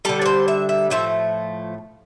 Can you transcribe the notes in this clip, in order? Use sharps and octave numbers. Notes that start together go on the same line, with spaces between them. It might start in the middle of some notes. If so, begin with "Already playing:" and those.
D3 G3 A4
D5
C5
E5
E5
A2 F3 A3 E5